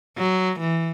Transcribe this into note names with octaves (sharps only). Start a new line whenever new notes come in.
F#3
E3